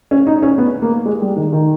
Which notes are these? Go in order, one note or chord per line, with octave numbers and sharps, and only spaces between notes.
C#4
D#4
C#4
B3
A#3
G#3
G3
D#3
D#3